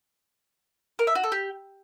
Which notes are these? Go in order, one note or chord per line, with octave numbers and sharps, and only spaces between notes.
A#4
E5
F#4
A4
G4